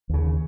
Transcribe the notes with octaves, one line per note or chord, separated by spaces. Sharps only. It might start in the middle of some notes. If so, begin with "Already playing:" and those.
D#2 C#3